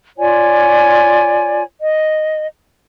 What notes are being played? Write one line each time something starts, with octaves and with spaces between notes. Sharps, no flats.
F4 C#5 D5 G#5
D#5